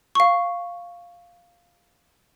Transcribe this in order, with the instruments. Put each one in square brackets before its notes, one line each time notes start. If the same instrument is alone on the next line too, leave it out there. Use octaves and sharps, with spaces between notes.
[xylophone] F5 C#6